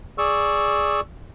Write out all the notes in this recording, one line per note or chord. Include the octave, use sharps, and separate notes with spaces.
G#4 D5 C#6 E6